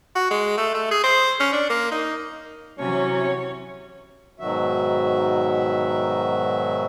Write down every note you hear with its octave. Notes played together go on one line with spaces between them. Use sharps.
F#4
G#3
A3
A3
G#4
C5
C#4
D4
A#3
D#4
C3 E3 F#3 C#4 C#5
G#2 B2 D#3 F#3 F#4 E5